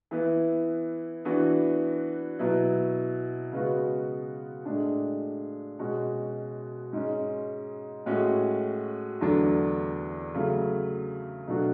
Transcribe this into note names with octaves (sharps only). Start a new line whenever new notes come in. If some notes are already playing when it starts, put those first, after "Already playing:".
E3 B3 E4
E3 B3 D4 F#4
B2 F#3 B3 E4
C#3 G#3 B3 F#4
A2 G#3 D4
B2 G#3 C#4 F#4
G#2 G#3 C#4
A2 G#3 C#4 F#4
E2 D3 F#3 A3 D4
C#3 F#3 A3
B2 F#3 A3 D4 F#4